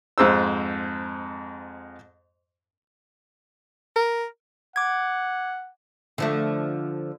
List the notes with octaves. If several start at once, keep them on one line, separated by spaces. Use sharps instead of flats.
F2 G#2 C5 E6
A#4
F#5 D6 G#6
D3 F3 A3